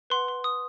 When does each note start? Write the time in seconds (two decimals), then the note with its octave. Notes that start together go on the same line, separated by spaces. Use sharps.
0.10 B4 F#5 C6
0.28 C6
0.44 D#6